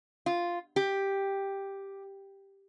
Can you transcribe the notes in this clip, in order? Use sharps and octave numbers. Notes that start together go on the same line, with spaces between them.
F4
G4